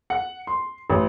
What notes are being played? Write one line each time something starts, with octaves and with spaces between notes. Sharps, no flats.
F#5
C6
A1